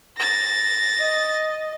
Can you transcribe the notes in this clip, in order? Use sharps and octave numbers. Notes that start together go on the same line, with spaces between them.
A6 A#6
D#5